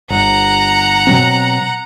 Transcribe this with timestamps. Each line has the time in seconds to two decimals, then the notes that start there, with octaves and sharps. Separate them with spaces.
0.10 G1 F#5 A#5
1.07 B2 F#3 C4